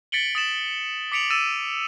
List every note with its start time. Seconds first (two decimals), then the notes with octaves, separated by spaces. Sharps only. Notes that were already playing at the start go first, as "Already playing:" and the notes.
0.12 A6 B6 C#7 D7 F#7 G7
0.35 D#6 A6 E7 F#7
1.12 D6 B6 C#7 D7 F7 F#7
1.30 E6 A6 D#7 E7